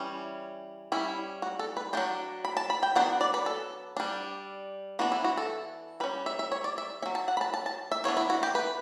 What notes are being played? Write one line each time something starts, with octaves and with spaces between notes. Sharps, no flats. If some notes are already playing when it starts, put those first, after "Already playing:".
Already playing: E3 G3 C#4
G3 C#4 E4
F#4
A4
B4
F#3 A3 D4 G5
B5
A5
B5
G5
F#3 B3 D4 F#5
D5
B4
A4
G3 D4
E3 B3 D4 F#4
E4
F#4
A4
G3 C#4 B4
E5
E5
C#5
D5
E5
C#4 E5
F#3
A5
F#5
B5
A5
A5
A5
E5
E3 B3 D4 C#5
E4
F#4
G4
B4